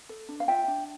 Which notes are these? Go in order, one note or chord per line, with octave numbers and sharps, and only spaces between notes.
A4
D4
F5
F4 E5 G5
D4